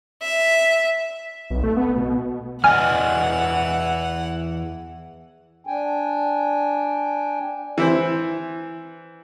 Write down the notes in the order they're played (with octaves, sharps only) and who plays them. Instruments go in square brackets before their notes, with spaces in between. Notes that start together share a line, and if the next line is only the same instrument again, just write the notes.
[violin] E5
[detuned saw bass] B1
A3
B3
B2
[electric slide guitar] E2 D5 D#5 [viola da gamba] E3 [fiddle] F#5 [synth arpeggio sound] G#5 F6
[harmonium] D4 G5 G#5
[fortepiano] E3 E4 C5